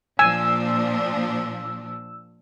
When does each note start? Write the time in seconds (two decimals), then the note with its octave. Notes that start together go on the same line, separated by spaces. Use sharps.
0.19 A#2 F3 D4 G#5 E6